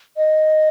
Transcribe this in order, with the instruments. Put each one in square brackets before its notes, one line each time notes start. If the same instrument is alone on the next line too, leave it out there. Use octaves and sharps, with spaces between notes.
[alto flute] D#5